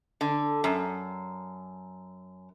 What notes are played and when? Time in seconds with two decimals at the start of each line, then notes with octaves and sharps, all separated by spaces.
0.21 D3
0.64 F#2